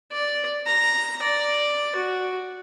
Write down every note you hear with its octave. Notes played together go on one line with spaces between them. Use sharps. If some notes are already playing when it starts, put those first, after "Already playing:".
D5
A#5
D5
F#4